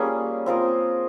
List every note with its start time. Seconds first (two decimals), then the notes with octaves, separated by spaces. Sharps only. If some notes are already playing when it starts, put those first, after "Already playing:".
Already playing: G3 A#3 C#4 F4 G#4
0.46 C4 F4 A#4 D#5